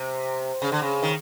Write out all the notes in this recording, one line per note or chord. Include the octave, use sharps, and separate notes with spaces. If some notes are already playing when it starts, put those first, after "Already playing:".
Already playing: C3
C#3
D3
C#3
D#3